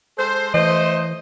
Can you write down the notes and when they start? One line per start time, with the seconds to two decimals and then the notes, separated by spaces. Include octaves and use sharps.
0.18 G#3 A4 C5
0.54 E3 A3 C5 D#5